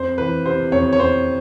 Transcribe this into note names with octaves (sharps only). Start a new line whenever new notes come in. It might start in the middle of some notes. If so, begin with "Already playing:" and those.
Already playing: F2 C5
E3 B4
C3 C5
F2 C#5
C#5
F2 C5